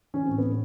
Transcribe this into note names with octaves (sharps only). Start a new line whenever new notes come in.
E3 C#4
A2 C4
B3
A2